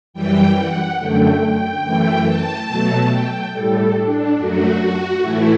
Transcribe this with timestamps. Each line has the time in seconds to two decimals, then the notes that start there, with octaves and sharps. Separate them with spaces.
0.14 F#2 E3 G3 G5
0.57 F#5
0.99 F#2 D3 A3 G5
1.41 G5
1.83 F#2 E3 A3
2.26 A5
2.68 B2 F#3 A3
3.10 G5
3.52 A2 G3 A4
3.95 D4
4.37 F#2 F#3 A3 F#4
4.80 F#4
5.21 A2 E3 A3 E4